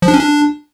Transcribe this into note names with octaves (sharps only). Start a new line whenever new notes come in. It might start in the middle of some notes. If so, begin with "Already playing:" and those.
F3
D4
C#4
D4